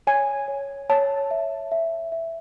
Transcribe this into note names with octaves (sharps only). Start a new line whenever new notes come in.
C#5 G#5
C#5
C#5 A5
E5
E5
E5